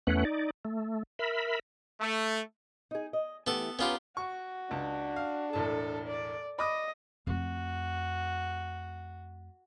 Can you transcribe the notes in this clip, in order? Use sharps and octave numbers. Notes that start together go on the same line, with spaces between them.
E2 A3 C#4 B4 F#5
D#4 D5
A3
A#4 E5 B5
A3
D#4 G#4
D#5
E3 A3 B3 G4 A4
B3 C#4 F4 G4 B4 A#5
F#4 C#6
C#2 D4 A5
F5
E1 A2 A4 A5
D5
D#5 B5 D6 D#6
F2 A3 F#4